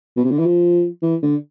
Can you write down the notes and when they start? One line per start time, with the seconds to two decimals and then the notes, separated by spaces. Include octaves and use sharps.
0.17 B2
0.24 C3
0.31 D3
0.39 E3
0.46 F3
1.02 E3
1.22 D3